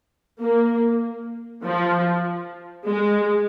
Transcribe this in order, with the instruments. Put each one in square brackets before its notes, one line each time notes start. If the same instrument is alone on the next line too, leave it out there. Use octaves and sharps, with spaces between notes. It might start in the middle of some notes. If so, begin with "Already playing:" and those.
[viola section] A#3
F3
G#3